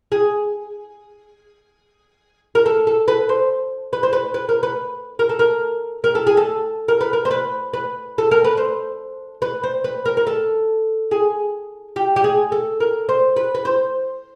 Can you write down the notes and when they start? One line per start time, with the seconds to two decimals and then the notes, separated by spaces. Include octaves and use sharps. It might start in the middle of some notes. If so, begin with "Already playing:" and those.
0.12 G#4
2.55 A#4
2.66 A4
2.87 A4
3.08 B4
3.29 C5
3.93 B4
4.03 C5
4.13 B4
4.34 B4
4.49 A#4
4.63 B4
5.19 A#4
5.29 A4
5.39 A#4
6.04 A#4
6.15 A4
6.27 G#4
6.37 A4
6.88 A#4
7.01 B4
7.13 A#4
7.25 C5
7.31 B4
7.74 B4
8.18 A4
8.31 A#4
8.44 B4
8.57 C5
9.42 B4
9.63 C5
9.84 B4
10.05 A#4
10.17 A#4
10.27 A4
11.11 G#4
11.96 G4
12.16 G4
12.24 G#4
12.52 A4
12.80 A#4
13.09 C5
13.36 B4
13.55 B4
13.65 C5